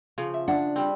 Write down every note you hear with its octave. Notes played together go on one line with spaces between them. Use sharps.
C#3 F3
E5
D4 F#5
G3 C4